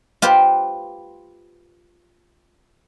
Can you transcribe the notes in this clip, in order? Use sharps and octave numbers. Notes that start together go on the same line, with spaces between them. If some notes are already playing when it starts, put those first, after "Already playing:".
F4 G4 B4 C5